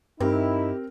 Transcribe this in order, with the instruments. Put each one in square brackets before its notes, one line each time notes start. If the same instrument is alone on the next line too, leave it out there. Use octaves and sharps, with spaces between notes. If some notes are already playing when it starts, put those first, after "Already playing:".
[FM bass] G2 [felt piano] C4 A#4 [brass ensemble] D#4 E4 [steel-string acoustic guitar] G4